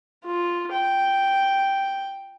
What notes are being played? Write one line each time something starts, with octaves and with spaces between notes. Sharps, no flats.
F4
G5